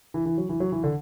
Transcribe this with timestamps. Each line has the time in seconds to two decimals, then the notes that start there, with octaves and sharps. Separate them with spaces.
0.14 E3
0.26 E3
0.38 F#3
0.49 E3
0.60 F#3
0.72 E3
0.84 D3